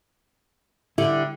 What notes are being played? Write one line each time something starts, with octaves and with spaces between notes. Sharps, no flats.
D3 G3 E4